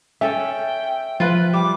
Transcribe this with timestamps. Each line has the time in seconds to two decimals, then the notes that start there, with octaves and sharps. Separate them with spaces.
0.21 C#4 A4 E5 G5
1.20 F3 F4 B4
1.53 G3 D6